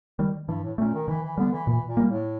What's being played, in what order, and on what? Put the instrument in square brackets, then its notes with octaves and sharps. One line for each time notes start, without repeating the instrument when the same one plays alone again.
[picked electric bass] D#3 G3
[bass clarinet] G2 [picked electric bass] E3
[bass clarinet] A2
[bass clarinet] A#2 [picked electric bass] A3 C#4
[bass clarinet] D#3
[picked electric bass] D#3 [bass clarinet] E3
[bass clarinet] E3
[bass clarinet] D3 [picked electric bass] G3 B3
[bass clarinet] E3
[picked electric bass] A#2 [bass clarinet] E3
[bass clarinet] A#2
[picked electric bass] G3 A#3
[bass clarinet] A2